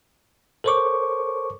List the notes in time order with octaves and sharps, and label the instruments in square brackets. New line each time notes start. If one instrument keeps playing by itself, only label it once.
[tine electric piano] A4 A#4 C5 C#5 C#6 D6